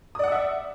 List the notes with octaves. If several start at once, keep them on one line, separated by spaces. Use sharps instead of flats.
D5 E5 F#5 D#6 E6